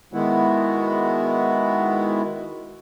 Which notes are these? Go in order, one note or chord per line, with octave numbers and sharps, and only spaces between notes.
D#3 G#3 B3 E4 F#4